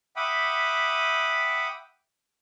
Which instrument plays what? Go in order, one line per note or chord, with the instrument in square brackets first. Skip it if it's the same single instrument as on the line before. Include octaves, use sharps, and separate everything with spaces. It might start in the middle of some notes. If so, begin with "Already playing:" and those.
[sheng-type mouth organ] E5 F#5 G5 B5 D6 D#6